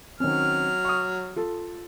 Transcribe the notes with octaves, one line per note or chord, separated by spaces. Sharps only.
D#3 F#3 C4 C#4 F6
C#6 D#6
F4 A4